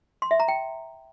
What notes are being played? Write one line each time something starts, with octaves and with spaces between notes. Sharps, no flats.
C6
E5
A#5
G5